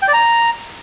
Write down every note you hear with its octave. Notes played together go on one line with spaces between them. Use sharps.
G5
D5
A#5